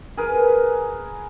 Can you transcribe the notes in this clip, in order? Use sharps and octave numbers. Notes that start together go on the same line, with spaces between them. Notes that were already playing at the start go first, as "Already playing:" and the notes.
G#4 A#4 B4